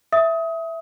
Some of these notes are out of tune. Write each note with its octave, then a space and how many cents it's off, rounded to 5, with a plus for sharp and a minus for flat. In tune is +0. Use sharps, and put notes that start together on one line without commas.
E5 +0 D#6 +25